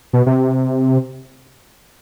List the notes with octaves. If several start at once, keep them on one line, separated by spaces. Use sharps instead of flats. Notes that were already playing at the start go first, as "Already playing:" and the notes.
B2
C3